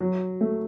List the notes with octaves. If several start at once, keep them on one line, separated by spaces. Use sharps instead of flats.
F#3
A3